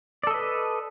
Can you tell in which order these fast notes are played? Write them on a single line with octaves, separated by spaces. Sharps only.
D5 A4 D#5 B4